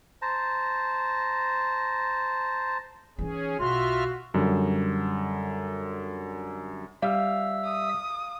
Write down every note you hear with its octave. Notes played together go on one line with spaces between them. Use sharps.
C5 A5 A#5
E3 C#4 D#4 G#4
B1 F4 F#4 E5 C6 F6
F#2 D3 G3
G3 E5 F5 E6
D#6